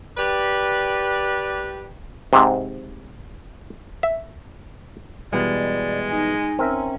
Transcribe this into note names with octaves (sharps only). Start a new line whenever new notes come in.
G4 B4 D5
G#2 C3
E5
B2 E3 G3 G#3 D5
D#4 G#5
C4 C#4 A#4 E5